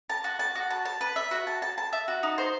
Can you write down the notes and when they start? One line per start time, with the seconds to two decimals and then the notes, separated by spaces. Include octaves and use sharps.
0.10 A5
0.24 F#4
0.39 A5
0.55 F#4
0.71 A5
0.85 A5
1.01 B4
1.16 E5
1.31 F#4
1.47 A5
1.62 A5
1.78 A5
1.93 E5
2.08 F#4
2.23 D#4
2.38 C5